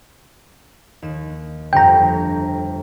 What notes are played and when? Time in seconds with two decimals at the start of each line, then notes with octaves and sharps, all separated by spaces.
1.02 D#2 E7
1.73 G1 F2 G5 A#5